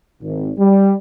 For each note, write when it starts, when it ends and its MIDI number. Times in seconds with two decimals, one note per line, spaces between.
0.22 0.51 32
0.58 0.94 55